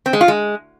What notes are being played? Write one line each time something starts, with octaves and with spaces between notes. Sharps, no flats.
C4
G#3
F4
G#3